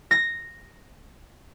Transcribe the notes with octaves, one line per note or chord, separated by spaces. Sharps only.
A#6